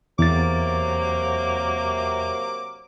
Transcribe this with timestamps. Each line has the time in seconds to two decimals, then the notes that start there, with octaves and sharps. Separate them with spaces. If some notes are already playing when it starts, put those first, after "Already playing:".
0.19 E2 C3 F#3 A#3 D6 A6